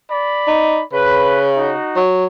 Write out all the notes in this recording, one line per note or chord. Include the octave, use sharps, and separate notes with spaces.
D5 B5
D#4
C#3 B4
D#4 F#4
F#3